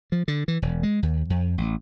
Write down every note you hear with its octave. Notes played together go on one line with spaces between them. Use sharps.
F3
D3
E3
E1
G#3
D#2
F2
A1